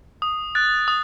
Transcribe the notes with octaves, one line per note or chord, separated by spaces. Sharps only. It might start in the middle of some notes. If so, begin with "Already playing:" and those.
D#6
F#6 A6
D#6